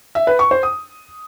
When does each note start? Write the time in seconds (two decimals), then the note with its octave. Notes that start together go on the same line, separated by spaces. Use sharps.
0.15 E5
0.27 B4
0.39 C#6
0.51 C5
0.63 D#6